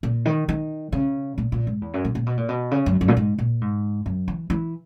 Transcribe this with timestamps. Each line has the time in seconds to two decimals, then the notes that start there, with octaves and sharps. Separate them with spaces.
0.03 A#2
0.25 D#3
0.49 D#3
0.92 C#3
1.38 A#2
1.52 A#2
1.67 G#2
1.81 E2
1.94 F#2
2.04 A#2
2.15 A#2
2.26 B2
2.37 A#2
2.49 B2
2.71 C#3
2.86 F#2
3.01 F#2
3.08 A#2
3.17 G#2
3.38 A#2
3.61 G#2
4.06 F#2
4.28 E3
4.50 E3